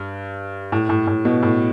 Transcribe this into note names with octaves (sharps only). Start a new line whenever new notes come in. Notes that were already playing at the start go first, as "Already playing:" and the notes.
Already playing: G2
A2
A2
A2
B2
A2